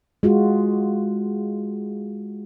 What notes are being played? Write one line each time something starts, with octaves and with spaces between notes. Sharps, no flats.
G#3 F4 F#4